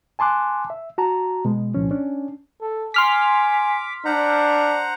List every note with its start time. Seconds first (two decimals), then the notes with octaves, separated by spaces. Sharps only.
0.19 G#5 A5 C6 D6 F#6
0.70 E5
0.98 F#4 A5 A#5
1.45 B2 G#3
1.75 C2 A#2 F3 C#4
1.91 C#4 D4
2.62 A4
2.94 G#5 C6 D6 F6 B6
4.05 D4 C5 F#5 A#5